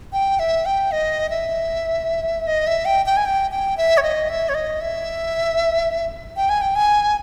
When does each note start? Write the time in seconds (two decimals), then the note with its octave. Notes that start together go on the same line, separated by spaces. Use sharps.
0.13 G5
0.39 E5
0.65 G5
0.91 D#5
1.30 E5
2.47 D#5
2.67 E5
2.85 G5
3.06 G5
3.17 G#5
3.25 G5
3.51 G5
3.77 E5
3.97 C#5
4.03 D#5
4.29 E5
4.49 C#5
4.54 D#5
4.81 E5
6.36 G5
6.49 G#5
6.61 G5
6.75 G#5